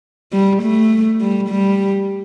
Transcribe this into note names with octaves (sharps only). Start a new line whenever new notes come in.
G3
A3
G3
G3